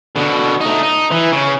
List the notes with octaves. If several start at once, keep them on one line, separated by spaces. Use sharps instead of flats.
B2 D3
A3 D#4
D#4
E3
C#3